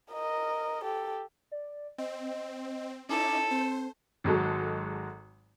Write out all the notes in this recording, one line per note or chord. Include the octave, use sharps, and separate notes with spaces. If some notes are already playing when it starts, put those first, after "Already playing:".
A#4 D#5
G4 A4
D5
C4 D#5
C#4 D#4 E4 A4 D6
C4 C5
G#1 F#3 G#3 A4